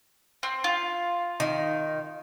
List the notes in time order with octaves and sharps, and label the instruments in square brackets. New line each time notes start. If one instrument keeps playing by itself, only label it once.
[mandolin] C4
F4
[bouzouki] D#3